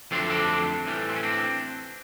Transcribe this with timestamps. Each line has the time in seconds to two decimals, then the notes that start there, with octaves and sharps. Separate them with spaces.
0.11 F2 D3 F#3 A3 C4 D4
0.30 C4 D4
0.86 A2 E3 G3
1.09 C4
1.16 C#4
1.23 C4 D4